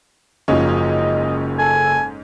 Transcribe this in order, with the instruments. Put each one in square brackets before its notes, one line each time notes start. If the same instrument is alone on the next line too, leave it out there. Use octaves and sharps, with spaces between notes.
[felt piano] F#1 F3 [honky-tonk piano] G#2 C#4 [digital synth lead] D#5
[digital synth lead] A4 [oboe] G#5